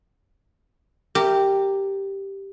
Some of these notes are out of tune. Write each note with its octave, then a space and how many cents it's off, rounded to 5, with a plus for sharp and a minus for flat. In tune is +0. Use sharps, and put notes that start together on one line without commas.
G4 +0 A#4 -20